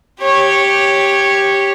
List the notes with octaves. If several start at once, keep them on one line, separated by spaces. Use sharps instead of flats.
G4 C#5